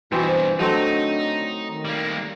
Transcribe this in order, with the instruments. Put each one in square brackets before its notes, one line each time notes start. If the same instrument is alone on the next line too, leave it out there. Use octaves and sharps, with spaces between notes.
[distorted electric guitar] G2 B2 [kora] E3 C4 [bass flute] F#4
[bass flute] C5
[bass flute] D3 [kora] F#3 A3 C4 [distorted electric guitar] D#4
[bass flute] D#3
[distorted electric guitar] G3 A#3